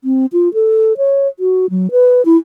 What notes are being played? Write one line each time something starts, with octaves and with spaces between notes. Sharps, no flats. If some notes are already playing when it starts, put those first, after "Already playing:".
C4
F4
A4
C#5
F#4
F#3
B4
E4